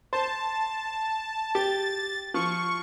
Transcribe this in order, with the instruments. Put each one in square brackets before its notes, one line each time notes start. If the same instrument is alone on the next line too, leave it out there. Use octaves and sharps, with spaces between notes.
[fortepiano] C5 [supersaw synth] A5
[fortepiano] G4 [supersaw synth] A6
[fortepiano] F3 [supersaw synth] C#6